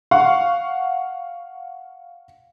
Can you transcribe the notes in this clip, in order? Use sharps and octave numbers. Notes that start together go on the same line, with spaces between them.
F5 F#5 C#6